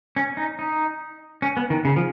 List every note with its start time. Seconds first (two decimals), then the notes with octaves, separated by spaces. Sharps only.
0.16 C#4
0.37 D#4
0.59 D#4
1.42 C#4
1.57 B3
1.70 D#3
1.85 C#3
1.96 F3